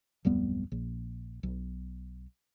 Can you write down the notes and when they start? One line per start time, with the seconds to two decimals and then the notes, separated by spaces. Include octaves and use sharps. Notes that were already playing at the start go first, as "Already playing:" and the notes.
0.25 D1 F2 G3 B3
0.72 A#1
1.43 B1